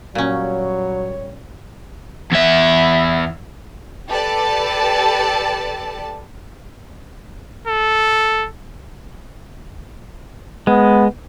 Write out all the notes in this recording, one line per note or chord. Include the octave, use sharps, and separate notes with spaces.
A#2 F#3 G3 C#4 C#5
E2 E5
G4 A4 B4 D5 A5
A4
G#3 B3